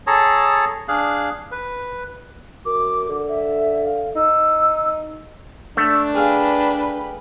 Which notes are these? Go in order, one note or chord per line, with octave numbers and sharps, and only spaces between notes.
G#4 A4 C#5 A5 A#5
D4 G#4 F5 F#6
B4
F#2 D6
D3
E5
F5
D#4 E6
A3 D4
G#4 B4 F5 G5 D6